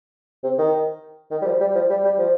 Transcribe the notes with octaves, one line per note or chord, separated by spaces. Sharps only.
C3
D#3
D#3
G3
F3
G3
F3
G3
G3
F3